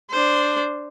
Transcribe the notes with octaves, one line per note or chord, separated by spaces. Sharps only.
D4 C5